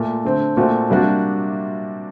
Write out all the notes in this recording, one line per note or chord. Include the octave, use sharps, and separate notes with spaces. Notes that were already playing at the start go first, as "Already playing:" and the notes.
Already playing: A#2 A3
D3 A3 C4
A#2 A3 C4 F#4
C3 G3 A#3 D4 F#4